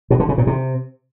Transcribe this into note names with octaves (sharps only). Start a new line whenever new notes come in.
B2
D3
C#3
A#2
C3